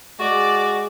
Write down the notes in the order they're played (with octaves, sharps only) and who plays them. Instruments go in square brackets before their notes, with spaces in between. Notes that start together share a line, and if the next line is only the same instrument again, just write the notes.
[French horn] G#3 [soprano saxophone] F#4 [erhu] D5